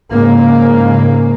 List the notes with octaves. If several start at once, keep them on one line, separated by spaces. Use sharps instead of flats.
G#2 C#3 A#3